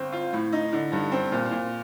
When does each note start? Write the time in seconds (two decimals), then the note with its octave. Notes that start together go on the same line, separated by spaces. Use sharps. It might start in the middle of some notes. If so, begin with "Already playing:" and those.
Already playing: G1 C4
0.12 F4
0.33 A2
0.52 D#4
0.73 D3
0.92 G2
1.12 C4
1.32 A#2
1.51 A#2